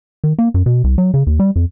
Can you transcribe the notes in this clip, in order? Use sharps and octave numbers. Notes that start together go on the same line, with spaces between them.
D#3
A#3
F#2
B2
C2
F#3
C#3
D#2
G3
F2